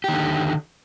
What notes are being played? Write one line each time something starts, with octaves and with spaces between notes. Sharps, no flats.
D3 D#3 G4